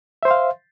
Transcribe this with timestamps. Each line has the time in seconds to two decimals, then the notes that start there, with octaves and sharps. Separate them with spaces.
0.23 E5
0.25 C5
0.28 C6
0.31 F5